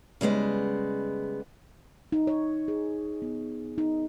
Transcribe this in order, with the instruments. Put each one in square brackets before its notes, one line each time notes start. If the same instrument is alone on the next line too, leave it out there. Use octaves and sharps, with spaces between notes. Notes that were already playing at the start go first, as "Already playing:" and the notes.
[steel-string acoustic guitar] C#3 G3 G#3 B3
[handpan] D#4
C#5
G#4
B3
D#4